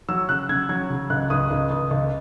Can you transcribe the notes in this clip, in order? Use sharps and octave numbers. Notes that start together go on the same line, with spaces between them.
F#3 E6
C#3 F#6
C#3 G#6
F#3 G#6
C#3
C#2 F#6
C#2 D#6
C#2
C#2
C#2